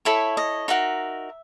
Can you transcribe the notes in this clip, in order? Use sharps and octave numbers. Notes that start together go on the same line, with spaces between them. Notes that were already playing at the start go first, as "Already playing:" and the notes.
E4 A4 C#5 E5
D#5
D#4 F#4 A#4 E5